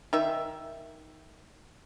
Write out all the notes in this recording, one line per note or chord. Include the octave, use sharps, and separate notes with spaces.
D#3 E5